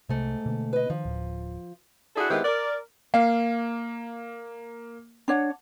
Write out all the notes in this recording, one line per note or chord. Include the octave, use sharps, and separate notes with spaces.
C2 G#2 C3 A3
B2 D3 A#3
B4 D#5
D#3 F3
D1
D4 E4 F#4 G#4 A4
D#3 G#3 B3 C4 E4 G4
A#4 D5
A#3 F5
D4 C#5 F#5